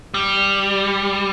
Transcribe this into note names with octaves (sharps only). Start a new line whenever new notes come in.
G3